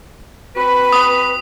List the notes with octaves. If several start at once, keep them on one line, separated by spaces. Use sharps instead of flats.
C4 F#4 B4
D#6